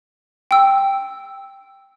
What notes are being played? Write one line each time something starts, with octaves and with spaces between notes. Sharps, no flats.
G5 E6